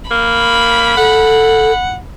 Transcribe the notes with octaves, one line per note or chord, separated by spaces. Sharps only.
A#3 B5
A4 F#5